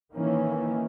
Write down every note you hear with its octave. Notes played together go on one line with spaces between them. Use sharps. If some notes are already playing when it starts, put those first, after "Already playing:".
D#3 E3 A#3 C#4